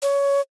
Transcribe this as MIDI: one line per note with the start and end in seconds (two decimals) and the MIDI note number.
0.02 0.41 73